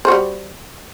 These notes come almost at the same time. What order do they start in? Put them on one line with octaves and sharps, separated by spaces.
C5 F#4 G3